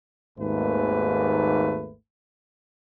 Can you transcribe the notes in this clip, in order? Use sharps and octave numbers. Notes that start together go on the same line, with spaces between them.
G#1 D#2 G#2 A3 A#3 B4